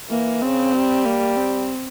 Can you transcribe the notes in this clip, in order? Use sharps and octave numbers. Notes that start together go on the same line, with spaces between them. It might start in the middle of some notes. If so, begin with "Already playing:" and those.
E3 A#3
C#3 C4
G3
A#3
C4